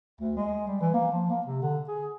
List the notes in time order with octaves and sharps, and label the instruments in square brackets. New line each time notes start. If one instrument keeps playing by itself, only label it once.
[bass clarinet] D2
G#3
G3
E3
A#3
F3
A#3
C3
D3
G#4